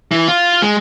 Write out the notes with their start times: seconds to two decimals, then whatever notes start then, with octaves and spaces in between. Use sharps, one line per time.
0.12 E3
0.28 F4
0.62 G#3